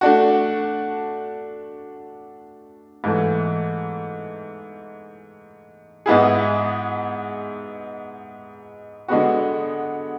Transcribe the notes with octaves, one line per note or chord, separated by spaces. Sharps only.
A3 D4 F#4
G#2 E3 A3
G#2 G#3 B3 E4 G#4
D3 G#3 B3 F#4